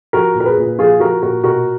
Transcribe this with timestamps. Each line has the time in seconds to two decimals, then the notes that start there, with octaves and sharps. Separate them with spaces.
0.13 F3 F#4 A#4
0.35 A#2
0.40 A#4
0.46 G#4 B4
0.58 A#2
0.78 F3 F4 G#4
1.00 F3 F#4 A#4
1.22 A#2 F#4 A#4
1.44 B2 F#4 A#4